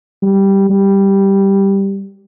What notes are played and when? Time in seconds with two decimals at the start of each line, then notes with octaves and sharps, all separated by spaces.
0.23 G3
0.70 G3